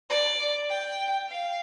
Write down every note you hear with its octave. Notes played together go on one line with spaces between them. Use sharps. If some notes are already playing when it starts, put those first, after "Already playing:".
D5
G5
F5